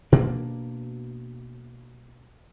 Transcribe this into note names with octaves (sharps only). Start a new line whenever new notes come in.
B2 A#3 D4